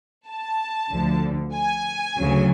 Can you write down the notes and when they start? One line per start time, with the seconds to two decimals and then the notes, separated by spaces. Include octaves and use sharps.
0.28 A5
0.90 D2 D3 F3
1.54 G#5
2.18 D2 C#3 F#3